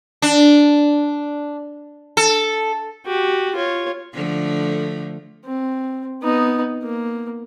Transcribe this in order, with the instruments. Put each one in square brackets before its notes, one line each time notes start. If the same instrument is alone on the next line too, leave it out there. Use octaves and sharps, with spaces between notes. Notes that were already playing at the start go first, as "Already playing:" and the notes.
[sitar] D4
A4
[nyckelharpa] F#4 G4
F4 C#5
[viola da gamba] D3 F3 A3
[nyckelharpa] C4
B3 D#4
A#3